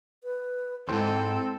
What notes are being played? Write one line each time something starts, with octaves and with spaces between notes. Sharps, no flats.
B4
D#2 G#2 C4 E4 A4